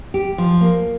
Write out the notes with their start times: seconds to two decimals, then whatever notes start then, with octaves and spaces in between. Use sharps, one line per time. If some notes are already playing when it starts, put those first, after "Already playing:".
0.14 G4
0.38 F3
0.61 A#3